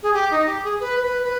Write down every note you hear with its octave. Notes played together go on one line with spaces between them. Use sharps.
G#4
G4
D#4
G4
G#4
B4
B4
B4